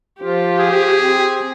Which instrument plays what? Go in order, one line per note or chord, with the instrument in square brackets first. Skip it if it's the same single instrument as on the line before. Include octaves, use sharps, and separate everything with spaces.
[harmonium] F3 F4 [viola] G4
[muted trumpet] G#4
[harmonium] C4